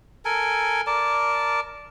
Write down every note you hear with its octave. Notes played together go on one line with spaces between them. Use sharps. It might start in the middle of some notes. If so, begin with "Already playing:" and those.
A4 A#4 G#5
A#4 D5 A5